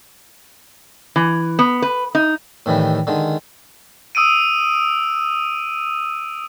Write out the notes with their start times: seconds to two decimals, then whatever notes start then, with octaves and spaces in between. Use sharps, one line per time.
1.16 E3
1.59 B3
1.82 B4
2.15 D#4
2.66 A2 D#3 E3 G3
3.07 D3 D#3 G#3
4.15 D#6 E6 D7 D#7